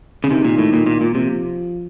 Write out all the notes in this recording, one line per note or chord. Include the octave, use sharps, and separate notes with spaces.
C#3
C3 D#3
A#2
A2
A#2
A#2
A#2
C3 F3